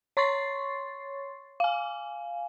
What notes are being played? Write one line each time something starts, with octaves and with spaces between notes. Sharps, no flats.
C#5 C6 C#6 A6 C7
F5 G#5